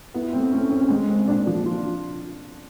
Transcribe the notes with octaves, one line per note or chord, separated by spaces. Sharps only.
B3 E4
A3 C4
A3 C#4
C4 C#4
G#3
C4
A#2 D4
F3
F4